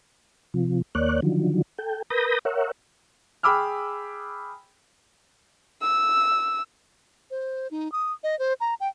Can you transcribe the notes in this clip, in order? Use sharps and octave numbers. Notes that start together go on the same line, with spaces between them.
C3 F3
D#2 A#3 C#5 D5 F#6
D3 D#3 F3 F#3
A4 G5
A#4 B4 B5 D#6 G6 A#6
A#4 C#5 E5 F#5
G#4 G5 B5 D6 E6 F6
E6
C5
D#4
D#6
D#5
C5
A#5
G5